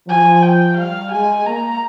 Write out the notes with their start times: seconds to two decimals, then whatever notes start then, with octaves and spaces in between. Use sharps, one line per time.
0.08 F3 G#5
0.43 G5
0.77 G3 F5
1.12 G#3 G#5
1.46 A#3 A#5